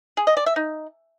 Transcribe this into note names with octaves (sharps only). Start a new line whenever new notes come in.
G#4
D#5
D5
E5
D#4